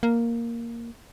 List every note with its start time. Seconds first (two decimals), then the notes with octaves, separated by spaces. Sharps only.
0.03 A#3